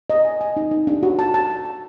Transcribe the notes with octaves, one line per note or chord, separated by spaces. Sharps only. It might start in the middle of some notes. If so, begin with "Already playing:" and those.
D#5
G#5
G#5
D#4
D#4
D4
F#4
A5
A5
A5
A5